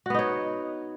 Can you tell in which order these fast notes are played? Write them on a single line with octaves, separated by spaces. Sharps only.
F#4 B3 D#4 C#5